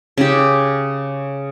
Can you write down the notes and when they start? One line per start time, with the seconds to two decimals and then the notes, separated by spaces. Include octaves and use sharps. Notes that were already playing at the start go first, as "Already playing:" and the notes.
0.18 C#3 G4